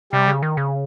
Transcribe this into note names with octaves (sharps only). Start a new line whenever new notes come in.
C3 G3
C#3
D#3
C#3